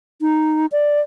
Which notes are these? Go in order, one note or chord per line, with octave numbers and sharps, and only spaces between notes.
D#4
D5